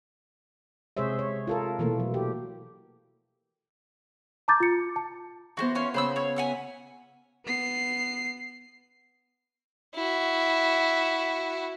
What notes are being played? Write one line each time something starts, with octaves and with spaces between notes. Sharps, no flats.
C3 G#3 G#4 C5 C#5 E5
C#5
F4 A4 A#4
B2 E3 A3 A#3
F#3
G4
A5 A#5 D6 G6 A6
F4 C#7
A5
E3 B3 F#4 G#4 C5
C#4 F4 C#5 C6
C#3 B3 C5 B5 E6
C#5
E5 F#5 G#5
B3 C7
E4 F#4